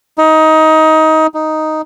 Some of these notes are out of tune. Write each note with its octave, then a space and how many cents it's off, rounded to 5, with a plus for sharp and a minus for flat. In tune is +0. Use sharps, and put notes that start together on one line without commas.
D#4 +20
D#4 +0